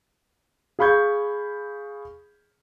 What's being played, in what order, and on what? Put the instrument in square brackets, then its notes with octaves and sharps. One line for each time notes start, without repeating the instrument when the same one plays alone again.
[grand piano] G#4 F5 B5 C#6 G6 G#6